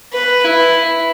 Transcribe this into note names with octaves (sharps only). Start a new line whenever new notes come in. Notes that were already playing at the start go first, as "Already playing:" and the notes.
B4
E4